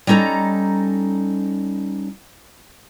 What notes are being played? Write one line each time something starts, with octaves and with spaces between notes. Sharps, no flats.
G3 C#4 D#4 A4 A#5